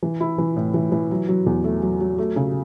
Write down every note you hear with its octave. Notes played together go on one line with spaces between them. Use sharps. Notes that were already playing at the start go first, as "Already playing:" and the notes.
E3
E4
E3
A2
E3
E3
F#3
F#3
E2
A3
F#3
F#3
A3
C#3